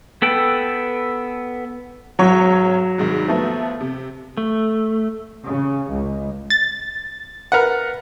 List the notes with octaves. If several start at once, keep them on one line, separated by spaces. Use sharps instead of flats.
B3 A4 B4 G5
G#1 F#3 C#5 C#6
C2 G#2 D#3
F3 A3 B3
C3
A3
C#3
C#2
A6
A#4 B4 F#5